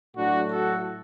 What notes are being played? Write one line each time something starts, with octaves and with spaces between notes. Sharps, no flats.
A2 F#3 A3 D4 F#4
F#4 A4